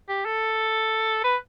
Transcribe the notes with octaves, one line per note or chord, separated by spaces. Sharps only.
G4
A4
B4